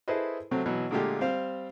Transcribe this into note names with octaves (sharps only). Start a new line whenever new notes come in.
E4 G#4 A4 B4 C5 D#5
C3 F#3 A3 C4
B2 E3 F#3
A#2 D3 G#3 A3 F4 G4
G3 C4 C5 F5